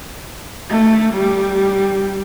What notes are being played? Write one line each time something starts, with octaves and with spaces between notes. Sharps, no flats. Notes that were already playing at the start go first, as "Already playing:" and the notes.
A3
G3